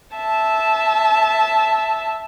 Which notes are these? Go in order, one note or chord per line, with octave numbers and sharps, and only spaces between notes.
E5 A5